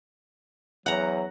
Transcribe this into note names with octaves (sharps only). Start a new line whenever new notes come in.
E2 F#3 F#5 A#5